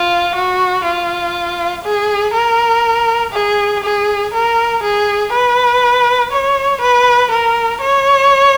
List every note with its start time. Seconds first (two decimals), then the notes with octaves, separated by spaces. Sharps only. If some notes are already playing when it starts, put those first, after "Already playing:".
Already playing: F4
0.35 F#4
0.85 F4
1.85 G#4
2.33 A#4
3.33 G#4
3.84 G#4
4.33 A#4
4.83 G#4
5.32 B4
6.32 C#5
6.81 B4
7.31 A#4
7.81 C#5